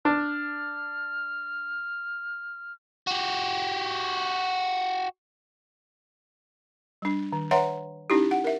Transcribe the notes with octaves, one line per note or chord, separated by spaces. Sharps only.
D4 F6
F#4 G4
G3 D4
D#3
B4 C#5 E5 F#5 A#5 C6
C#4 D#4 E4 G4
F#5
A#4 E5